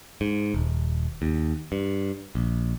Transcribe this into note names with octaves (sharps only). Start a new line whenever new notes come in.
G#2
D#1
D#2
G2
A#1